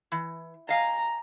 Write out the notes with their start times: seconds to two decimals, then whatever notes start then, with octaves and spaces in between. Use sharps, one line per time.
0.12 E3
0.69 D#5 F5 G#5 A#5